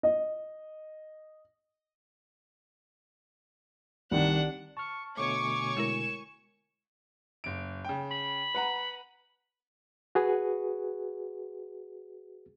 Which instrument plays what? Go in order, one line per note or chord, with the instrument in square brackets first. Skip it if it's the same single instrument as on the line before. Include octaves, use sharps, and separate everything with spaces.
[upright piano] D#5
[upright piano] C2 D#3 [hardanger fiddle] D4 F#5
[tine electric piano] A5 F6 [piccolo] C#6
[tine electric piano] B2 D3 A3 [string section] C#5 G#5 C#6 [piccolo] D6
[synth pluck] G#3 E4 A#4 [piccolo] E7
[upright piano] F#1 D7
C#3 G5
[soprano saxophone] B5
[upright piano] B4 F#5 A#5
[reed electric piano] F#4 G#4 B4